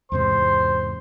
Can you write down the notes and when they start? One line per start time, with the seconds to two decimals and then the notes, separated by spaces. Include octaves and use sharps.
0.12 E2 G#2 C3 C5 C6